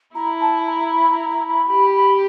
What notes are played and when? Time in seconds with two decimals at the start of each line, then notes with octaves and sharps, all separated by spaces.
0.15 E4 A#5
0.41 A5
0.66 A#5
0.93 B5
1.11 A#5
1.30 A#5
1.49 B5
1.68 G4 B5
1.94 B5